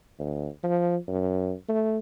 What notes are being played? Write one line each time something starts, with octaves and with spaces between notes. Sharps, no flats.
D2
F3
F#2
A3